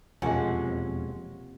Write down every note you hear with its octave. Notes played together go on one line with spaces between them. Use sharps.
E1 F2 C3 F3 G#3 A#3 C#4 F#5